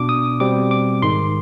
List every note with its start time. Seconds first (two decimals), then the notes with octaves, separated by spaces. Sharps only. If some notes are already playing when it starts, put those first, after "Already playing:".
Already playing: B2 B3 D4 D6
0.09 D#6
0.40 B2 G3 C4 D6
0.71 D6
1.02 G#2 D#3 G#3 C6